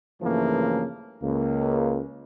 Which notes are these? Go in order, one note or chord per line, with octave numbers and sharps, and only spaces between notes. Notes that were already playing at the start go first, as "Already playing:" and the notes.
G2 C#3 E3 F3 A3 A#3
C#2 A#3